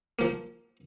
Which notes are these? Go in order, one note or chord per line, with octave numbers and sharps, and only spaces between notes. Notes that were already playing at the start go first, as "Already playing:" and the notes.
F3 A#3